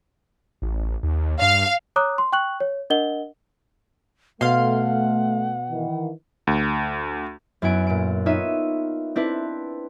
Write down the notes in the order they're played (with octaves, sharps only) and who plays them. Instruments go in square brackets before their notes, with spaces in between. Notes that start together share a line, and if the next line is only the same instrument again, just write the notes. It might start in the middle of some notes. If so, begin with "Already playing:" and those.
[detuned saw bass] A1
D#2
[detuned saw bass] G2 [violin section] F5
[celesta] C#5 A#5 D6 D#6 F#6
C6
G5 C#6 F#6 F#7
C#5
D4 A#4 D#5 F#5 G7
[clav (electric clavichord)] B2 [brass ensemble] A3 [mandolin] F5 C6 [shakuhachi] F#5
[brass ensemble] D#3 E3
[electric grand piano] D2
[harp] F#2 B3 E4 G#5 D7
A#2 D7
B3 D#4 F4 C#5 E5 D#7
C4 D4 E4 B4